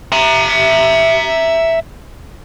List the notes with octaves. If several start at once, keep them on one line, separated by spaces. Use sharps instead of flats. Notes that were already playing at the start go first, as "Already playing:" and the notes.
E5 A#5